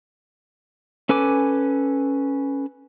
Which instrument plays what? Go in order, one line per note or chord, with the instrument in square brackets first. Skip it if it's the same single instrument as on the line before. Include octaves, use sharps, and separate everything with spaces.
[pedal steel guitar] C#4 A4 B4 G#5 D6